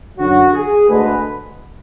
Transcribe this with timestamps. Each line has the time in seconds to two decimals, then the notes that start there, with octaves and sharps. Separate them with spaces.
0.18 F#2 D3 F#3 F#4
0.53 G#4
0.88 D2 D3 G#3 B4